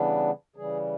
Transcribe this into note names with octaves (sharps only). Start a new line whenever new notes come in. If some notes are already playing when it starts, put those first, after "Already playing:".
Already playing: C#3 E3 G3 B3 D4
C#3 E3 G3 G#4